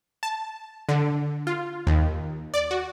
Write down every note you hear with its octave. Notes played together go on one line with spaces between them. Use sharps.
A5
D3
F4
D#2
D5
F#4